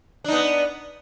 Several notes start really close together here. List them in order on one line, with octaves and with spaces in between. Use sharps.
D4 D#4 B3